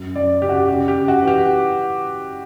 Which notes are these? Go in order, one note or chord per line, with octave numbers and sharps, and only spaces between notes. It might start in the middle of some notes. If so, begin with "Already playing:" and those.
Already playing: F#2
F#2 D5
C#3 G4
F#4
G4
C#3 G4
G4
C#3
F#4
E3
G4